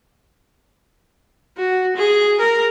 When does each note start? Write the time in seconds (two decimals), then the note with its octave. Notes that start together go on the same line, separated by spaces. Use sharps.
1.57 F#4
1.96 G#4
2.39 A#4